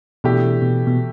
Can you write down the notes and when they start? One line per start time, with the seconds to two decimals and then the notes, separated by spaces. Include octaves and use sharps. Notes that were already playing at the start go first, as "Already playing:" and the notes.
0.24 B2 E3 A3 D4 G4
0.62 B2
0.87 B2